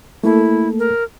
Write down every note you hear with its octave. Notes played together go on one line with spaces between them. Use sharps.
A3 A#3 E4 A4
A#4